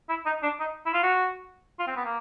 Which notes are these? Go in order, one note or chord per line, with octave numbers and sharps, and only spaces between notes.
E4
D#4
D4
D#4
E4
F4
F#4
F4
C4
B3
A#3